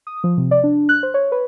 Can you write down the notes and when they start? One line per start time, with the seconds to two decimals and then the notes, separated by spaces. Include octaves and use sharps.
0.07 D#6
0.24 F3
0.38 C3
0.51 D5
0.64 D4
0.89 F#6
1.03 C5
1.14 C#5
1.32 B4